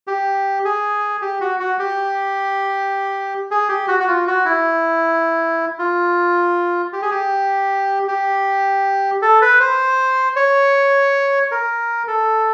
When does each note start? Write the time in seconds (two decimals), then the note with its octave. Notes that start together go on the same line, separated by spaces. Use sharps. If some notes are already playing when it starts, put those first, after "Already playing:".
0.07 G4
0.65 G#4
1.22 G4
1.41 F#4
1.60 F#4
1.79 G4
3.51 G#4
3.69 G4
3.88 F#4
4.00 F#4
4.07 F4
4.27 F#4
4.45 E4
5.79 F4
6.93 G4
7.02 G#4
7.11 G4
8.08 G4
9.22 A4
9.42 B4
9.60 C5
10.36 C#5
11.51 A#4
12.08 A4